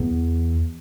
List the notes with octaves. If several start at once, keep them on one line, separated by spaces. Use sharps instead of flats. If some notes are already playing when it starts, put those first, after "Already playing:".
Already playing: E2